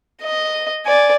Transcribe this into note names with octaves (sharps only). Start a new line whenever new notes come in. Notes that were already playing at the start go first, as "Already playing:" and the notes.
D#5
D5 G#5